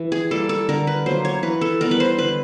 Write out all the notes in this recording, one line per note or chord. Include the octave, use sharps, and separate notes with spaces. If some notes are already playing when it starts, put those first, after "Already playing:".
Already playing: E3
G#4
G3 A#3 A4
A4
D3 A#4
B4
F#3 A#3 C5
C#5
E3 B4
A4
G3 B3 A#4
B4
C5
D3 B4